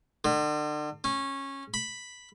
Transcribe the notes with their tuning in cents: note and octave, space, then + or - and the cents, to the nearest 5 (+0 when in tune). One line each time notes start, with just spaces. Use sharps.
D3 +40
C#4 -15
B5 +0